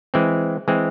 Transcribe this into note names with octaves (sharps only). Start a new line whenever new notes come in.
E3 G#3 C4
E3 G#3 C4